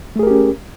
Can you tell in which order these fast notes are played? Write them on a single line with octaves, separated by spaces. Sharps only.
A3 G#4 A#4 G4 C#4